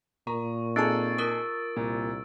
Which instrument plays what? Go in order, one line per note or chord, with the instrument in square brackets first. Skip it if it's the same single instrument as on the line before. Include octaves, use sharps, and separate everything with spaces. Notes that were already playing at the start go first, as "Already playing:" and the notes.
[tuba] A#2 [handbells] A#4 [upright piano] A#5 [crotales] C#6
[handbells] C4 C#6 [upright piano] D#4 G#4 A4 [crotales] E6 A6 D7
[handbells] F4 A#4 D#6
[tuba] C2 [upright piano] A#2